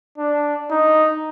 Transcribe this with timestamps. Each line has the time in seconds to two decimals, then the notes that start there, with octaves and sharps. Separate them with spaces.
0.18 D4
0.70 D#4